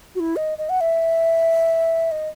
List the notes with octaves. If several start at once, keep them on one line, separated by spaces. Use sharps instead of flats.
F#4
E4
D#5
D#5
F#5
E5
D#5